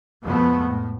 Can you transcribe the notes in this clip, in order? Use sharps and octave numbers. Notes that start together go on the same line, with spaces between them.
F2 B2 F3 G#3 A3 B3
A2